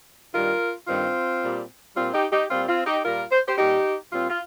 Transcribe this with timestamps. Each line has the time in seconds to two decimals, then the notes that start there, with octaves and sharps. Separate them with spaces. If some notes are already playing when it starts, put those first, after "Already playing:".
0.33 G2 D#3 G3 F4 A#4
0.88 G2 D#3 G3 C4 F4
1.42 A#2 G3
1.96 A#2 G3 C4 F4
2.14 D#4 G4
2.32 D#4 G4
2.50 A#2 G3 C4 F4
2.68 C4 F4
2.86 D#4 G4
3.04 A#2 G3 F4 A#4
3.32 C5
3.47 G4 C5
3.58 A#2 G3 D#4 G4
4.12 A#2 G3 C4 F4
4.30 F4